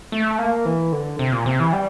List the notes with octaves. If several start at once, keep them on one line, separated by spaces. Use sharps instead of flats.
A3
A#3
E3
D3
C3
A#2
C3
E3
G3